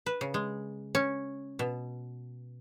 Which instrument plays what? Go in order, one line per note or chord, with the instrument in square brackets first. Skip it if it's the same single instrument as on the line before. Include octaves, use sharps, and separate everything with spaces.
[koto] B4
C#3
G#3
C#4
B2